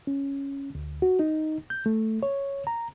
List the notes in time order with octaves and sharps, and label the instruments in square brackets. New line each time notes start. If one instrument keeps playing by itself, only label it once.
[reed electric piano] C#4
D2
F#4
D#4
G6
A3
C#5
A#5